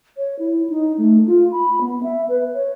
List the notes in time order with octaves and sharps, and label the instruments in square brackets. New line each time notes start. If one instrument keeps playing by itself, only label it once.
[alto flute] C#5
E4
D#4
A3
F4
B5
B3
E5
B4
C#5